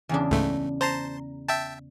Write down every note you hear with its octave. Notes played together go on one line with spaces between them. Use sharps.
E2 C#3 D4
C#2 G#2 A3
C5 A5 A#5 C6
E5 G5 A5